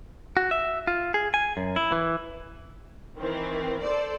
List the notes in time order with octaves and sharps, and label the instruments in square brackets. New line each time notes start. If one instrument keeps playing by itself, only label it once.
[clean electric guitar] F#4
E5
F4
G#4
G#5
F#2
E4
E3
[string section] D#3 E3 C4
A4 C5 D5